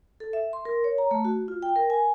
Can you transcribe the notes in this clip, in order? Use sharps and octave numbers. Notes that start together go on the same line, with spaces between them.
A4
E5
C6
A#4
C#5
A#5
A3
F#4
F4
G5
A#4
G#5